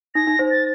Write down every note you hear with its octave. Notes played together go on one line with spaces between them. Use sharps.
D#4 A#6
D#4
C5
A6